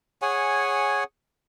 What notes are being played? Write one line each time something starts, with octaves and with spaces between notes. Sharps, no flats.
G#4 C#5 F#5 G#5